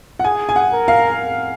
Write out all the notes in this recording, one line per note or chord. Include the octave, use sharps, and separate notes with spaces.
F#5
G#4 G#5
G#5
F#5
A#4
F5